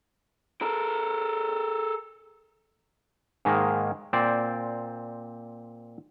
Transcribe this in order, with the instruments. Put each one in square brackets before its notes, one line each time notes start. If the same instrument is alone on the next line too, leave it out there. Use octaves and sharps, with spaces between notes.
[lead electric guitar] A4 A#4
[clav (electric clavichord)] G#2 D#3 G#3 A#3
A#2 C4 C5 D5